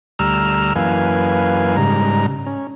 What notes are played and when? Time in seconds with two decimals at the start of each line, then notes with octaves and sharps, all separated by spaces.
0.19 D2 G3 A#5 E6 F6
0.76 F#2 E3 A#3 B4 F5 G#5
1.77 G#2 C#3 G3 A#5
2.46 C#4